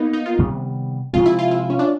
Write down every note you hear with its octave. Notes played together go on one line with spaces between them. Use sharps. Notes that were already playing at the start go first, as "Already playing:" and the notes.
Already playing: A#3 B3 D#4
D#4
F4
C3 D#3 G3 B3
C3 F3 G#3 C4 F4
E4
F4
E4
C#4
D4